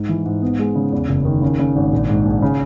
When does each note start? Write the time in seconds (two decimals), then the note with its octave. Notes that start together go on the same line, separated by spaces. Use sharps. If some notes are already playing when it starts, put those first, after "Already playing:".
Already playing: G#2
0.09 E3
0.26 G#2
0.42 B3
0.59 G#3
0.76 C#3
0.92 E2
1.09 F#1
1.25 D#3
1.42 C#3
1.59 C#3
1.76 G#1
1.93 A#1
2.09 G#2
2.25 A#1
2.42 C#3